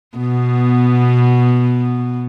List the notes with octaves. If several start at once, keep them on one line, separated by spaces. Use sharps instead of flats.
B2 B3